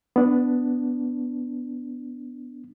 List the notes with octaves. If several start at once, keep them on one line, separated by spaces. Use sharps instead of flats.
B3 D4